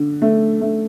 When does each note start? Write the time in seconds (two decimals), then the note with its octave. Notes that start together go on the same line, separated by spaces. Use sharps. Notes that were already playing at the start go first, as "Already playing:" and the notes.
Already playing: D3
0.22 A3
0.61 A3